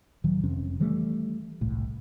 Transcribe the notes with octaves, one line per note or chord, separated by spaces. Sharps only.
D1 D#3 F#3
F1 F2 C3 C#4
D#3 E3 G3 A3
G1 C2 A2